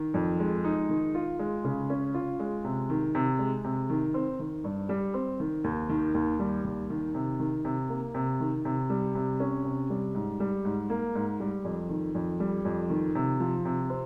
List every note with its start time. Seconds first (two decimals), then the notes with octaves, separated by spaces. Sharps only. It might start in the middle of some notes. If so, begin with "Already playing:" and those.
Already playing: D#3
0.14 F2
0.39 G#3
0.64 D#4
0.89 D#3
1.15 F4
1.39 G#3
1.64 C#3
1.90 C#4
2.14 F4
2.40 G#3
2.64 C3
2.90 D#3
3.15 C3
3.39 G#3
3.64 C3
3.90 D#3
4.14 C4
4.39 D#3
4.64 G2
4.89 G3
5.14 C4
5.40 D#3
5.64 D#2
5.89 D#3
6.14 D#2
6.39 G3
6.64 D#2
6.90 D#3
7.15 C3
7.39 D#3
7.65 C3
7.89 A#3
8.14 C3
8.40 D#3
8.65 C3
8.90 G3
9.15 C3
9.40 C#4
9.65 C3
9.90 G3
10.15 G#2
10.40 G3
10.65 G#2
10.90 A#3
11.15 G#2
11.40 G3
11.65 F2
11.89 D#3
12.15 F2
12.40 G3
12.65 F2
12.90 D#3
13.15 C3
13.40 F3
13.65 C3
13.90 C4